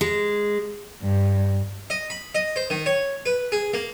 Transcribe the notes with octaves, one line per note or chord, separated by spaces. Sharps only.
G#3
G2
D#5
B5
D#5
C5
D#3
C#5
B4
G#4
A#3